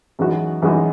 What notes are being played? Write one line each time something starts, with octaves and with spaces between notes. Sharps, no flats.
F#2 E3 G#3 D#4 F#4
F#2 E3 G#3 D#4 F#4